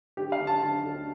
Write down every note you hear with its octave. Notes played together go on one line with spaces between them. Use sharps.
D3 G4
F5
D3
A5
D3 A5
D2